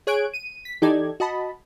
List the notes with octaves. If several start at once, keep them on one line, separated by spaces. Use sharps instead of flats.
G#4 C#5 G#5 F#6 G#6 D7
D#7
B6
E3 D#4 G4 A4 D5 G#6
F#4 D#5 A5 B5